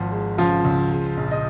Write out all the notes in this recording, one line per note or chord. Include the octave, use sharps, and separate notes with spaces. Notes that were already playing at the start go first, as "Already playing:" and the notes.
Already playing: G#1 F3
G#3
C#3 F3 F4
C#2
G#3
A#1
D#5